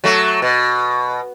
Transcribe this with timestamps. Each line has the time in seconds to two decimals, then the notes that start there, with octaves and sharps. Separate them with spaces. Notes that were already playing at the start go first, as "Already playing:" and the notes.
0.04 F#3 A3
0.42 B2